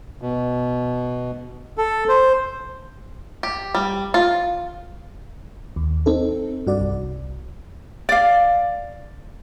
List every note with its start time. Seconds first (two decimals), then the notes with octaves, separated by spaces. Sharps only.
0.22 B2
1.78 A4
2.09 C5
3.43 G4
3.75 G3
4.14 F4
5.76 D#2
6.06 C4 D#4 A4
6.67 G2 F#4 D5
6.80 C2
8.09 D5 F5